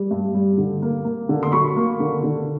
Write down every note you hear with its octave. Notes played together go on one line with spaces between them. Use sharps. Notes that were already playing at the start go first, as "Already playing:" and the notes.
Already playing: G3
G2
G3
D3
A#3
A#3
D3
C6
F#3 B5 C#6
A#3
D3
D3